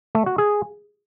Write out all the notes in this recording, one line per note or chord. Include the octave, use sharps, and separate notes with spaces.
A3
F#4
G#4